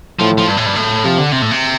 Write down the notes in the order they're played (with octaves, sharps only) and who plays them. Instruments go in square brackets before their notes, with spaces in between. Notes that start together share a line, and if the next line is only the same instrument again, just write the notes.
[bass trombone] A2 [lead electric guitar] F3
[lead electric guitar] F3
G2
A2
G2
A2
[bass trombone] C3 [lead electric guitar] F3
[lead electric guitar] D3
C3
A2
C3